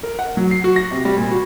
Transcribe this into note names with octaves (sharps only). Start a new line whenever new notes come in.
A#4
F#5
F#3
C7
F#4
A#6
C3
G3
A#2
F#4